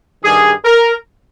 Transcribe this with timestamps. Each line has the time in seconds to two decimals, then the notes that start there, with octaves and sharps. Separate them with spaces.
0.24 G2 D#3 G3 G#4
0.65 A#4